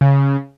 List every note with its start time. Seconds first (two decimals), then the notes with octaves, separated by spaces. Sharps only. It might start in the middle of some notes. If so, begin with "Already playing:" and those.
0.01 C#3